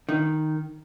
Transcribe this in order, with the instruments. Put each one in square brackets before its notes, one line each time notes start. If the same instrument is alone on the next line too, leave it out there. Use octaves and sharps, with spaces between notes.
[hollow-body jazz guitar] D#3